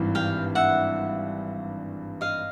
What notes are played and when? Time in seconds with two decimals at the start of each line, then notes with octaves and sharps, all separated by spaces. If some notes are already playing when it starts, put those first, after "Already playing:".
Already playing: G#1 G2 E3
0.15 F5 G5
0.55 E5 F#5
2.21 D#5 F5